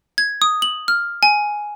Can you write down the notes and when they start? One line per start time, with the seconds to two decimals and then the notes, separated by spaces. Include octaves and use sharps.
0.18 G#6
0.42 D#6
0.62 F#7
0.88 F6
1.23 G#5